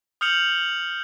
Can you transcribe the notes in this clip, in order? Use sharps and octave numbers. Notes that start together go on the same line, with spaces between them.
D#6 F6 G6 C#7 F7 F#7